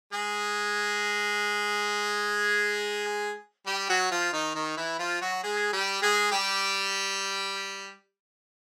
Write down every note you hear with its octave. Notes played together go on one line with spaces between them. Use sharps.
G#3 G#4
G3 G4
F#3 F#4
F3 F4
D#3 D#4
D#3 D#4
E3 E4
F3 F4
F#3 F#4
G#3 G#4
G3 G4
G#3 G#4
G3 G4